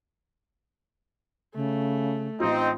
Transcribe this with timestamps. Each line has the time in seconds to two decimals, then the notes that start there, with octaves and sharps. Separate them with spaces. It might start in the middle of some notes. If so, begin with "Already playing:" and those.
1.55 C#3 A3
2.40 A1 C4 D#4 F4 D#5